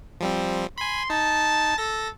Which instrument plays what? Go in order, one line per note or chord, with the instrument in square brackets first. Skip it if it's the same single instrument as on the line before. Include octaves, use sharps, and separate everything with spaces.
[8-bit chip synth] F3 G3 C4
[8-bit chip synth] G#5 B5 [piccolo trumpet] C6
[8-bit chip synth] D#4 [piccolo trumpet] A5
[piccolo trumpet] A4 [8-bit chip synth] A#6